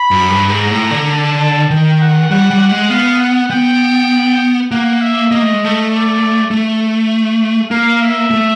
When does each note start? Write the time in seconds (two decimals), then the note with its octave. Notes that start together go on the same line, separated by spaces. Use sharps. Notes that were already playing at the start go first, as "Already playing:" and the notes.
Already playing: B5
0.11 F#2
0.30 G2
0.50 G#2 A#5
0.71 A2
0.91 D3
1.11 A5
1.70 D#3 G5
2.01 F#5
2.30 G3 F#5
2.51 G3
2.60 F#5
2.71 G#3
2.90 B3 F5
3.20 F#5
3.50 B3 G5
4.71 A#3 F#5
5.01 E5
5.31 A#3 D#5
5.42 A3
5.53 G#3
5.65 A3
5.91 D5
6.51 A3
7.71 A#3 F5
8.02 E5
8.31 A3